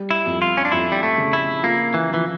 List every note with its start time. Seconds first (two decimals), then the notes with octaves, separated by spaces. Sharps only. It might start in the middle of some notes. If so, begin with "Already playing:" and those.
Already playing: G3
0.11 E4
0.26 F2
0.42 F4
0.57 C#4
0.65 D4
0.72 F2 E4
0.92 G3
1.03 A3
1.18 C#3
1.33 E4
1.63 A#3 F4
1.94 E3
2.09 E3 F3